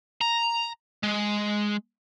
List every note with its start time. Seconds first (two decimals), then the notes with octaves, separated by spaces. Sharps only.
0.21 A#5
1.03 G#3